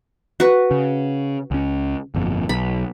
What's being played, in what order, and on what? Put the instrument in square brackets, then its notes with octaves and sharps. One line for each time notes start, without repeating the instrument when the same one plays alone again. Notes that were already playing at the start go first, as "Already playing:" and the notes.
[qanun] F#4 B4
[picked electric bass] C#3
C#2 C#4
G1 F2 A#2
[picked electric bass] B1 [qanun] B5